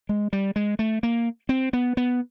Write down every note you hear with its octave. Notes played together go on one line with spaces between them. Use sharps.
G#3
G3
G#3
A3
A#3
C4
B3
B3